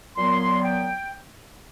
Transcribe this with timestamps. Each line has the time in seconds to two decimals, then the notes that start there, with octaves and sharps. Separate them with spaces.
0.16 A#2 F#3 B3 C6
0.63 G5